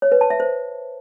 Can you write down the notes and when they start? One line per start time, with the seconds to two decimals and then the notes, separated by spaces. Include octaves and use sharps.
0.02 C#5
0.12 B4
0.21 A5
0.30 E5
0.40 C5